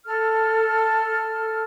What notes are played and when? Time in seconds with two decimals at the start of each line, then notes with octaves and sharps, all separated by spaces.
0.05 A4 F6